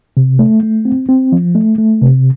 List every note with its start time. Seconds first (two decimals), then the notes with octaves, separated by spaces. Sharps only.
0.17 C3
0.39 A3
0.63 A3
0.85 C4
1.09 C4
1.32 F3
1.55 A3
1.78 A3
2.02 C3